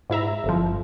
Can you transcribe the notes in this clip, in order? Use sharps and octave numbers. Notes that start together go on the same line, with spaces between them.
G#2 E4 E5 A#5
G1 F2 F3